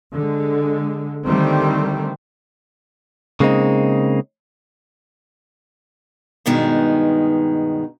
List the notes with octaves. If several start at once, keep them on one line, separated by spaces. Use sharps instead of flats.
D3 G#3
D3 D#3 G3 A3 C4
C#3 G#3 A#3 C4 D#4
G2 B2 D#3 G#3 B3 D#4